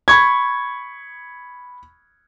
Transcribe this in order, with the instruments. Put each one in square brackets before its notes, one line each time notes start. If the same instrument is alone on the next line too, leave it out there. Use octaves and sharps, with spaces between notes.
[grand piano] B5 C#6 G#6